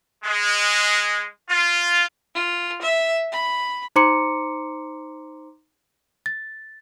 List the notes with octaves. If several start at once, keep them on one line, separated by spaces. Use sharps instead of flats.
G#3
F4
F4
E5
B5
D#4 C5 A#5 C6 D6 C#7
A6